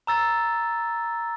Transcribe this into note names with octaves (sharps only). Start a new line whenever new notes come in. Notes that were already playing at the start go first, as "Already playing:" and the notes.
A#5 E6 A6